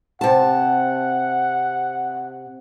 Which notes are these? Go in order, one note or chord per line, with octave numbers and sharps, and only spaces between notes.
C3 F#5 A5